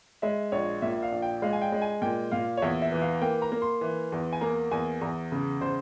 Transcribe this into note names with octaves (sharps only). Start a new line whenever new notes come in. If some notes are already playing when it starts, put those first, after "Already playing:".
G#3 E5
A#1 C#5
A#2 E5
F5
A#1
G5
G#3 F5
G#5
G5
G#3
G#5
A#2 G5
A#2 F5
C#5
E2 E5
E5
E3
F5
A#3 G5
A#5
A#3
C6
E3
E2
G#5
A#3 A#5
E2 G#5
E2 A#5
C#3
C#3 C5